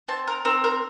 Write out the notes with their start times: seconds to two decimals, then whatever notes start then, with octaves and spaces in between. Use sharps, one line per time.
0.08 C4 A5
0.27 A#4
0.45 C4 A#4
0.64 A#4